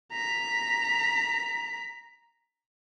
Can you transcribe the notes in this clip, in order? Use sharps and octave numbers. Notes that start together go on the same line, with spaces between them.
A#5 B6